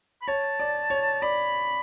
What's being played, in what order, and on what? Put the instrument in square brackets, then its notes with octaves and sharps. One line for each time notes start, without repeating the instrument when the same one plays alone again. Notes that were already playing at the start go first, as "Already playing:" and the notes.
[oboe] B5
[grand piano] C#5 [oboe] A5
[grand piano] D5
C#5
[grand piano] D5 [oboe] B5